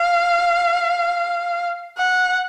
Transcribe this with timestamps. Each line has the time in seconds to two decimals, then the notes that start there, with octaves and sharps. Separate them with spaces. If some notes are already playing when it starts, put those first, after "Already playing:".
Already playing: F5
1.97 F#5